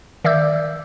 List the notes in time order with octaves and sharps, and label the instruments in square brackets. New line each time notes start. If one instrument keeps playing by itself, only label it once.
[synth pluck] D#3 D5 E5 D6 E6 G6